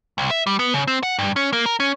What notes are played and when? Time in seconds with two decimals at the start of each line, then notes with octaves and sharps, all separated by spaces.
0.18 C2
0.31 E5
0.47 G3
0.59 B3
0.74 C#3
0.87 C4
1.03 F#5
1.19 G2
1.36 C#4
1.53 A#3
1.66 A#4
1.80 C#4